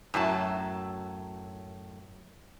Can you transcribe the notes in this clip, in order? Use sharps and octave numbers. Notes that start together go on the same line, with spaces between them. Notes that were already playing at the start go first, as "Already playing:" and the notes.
F#2 A2 F#3 A5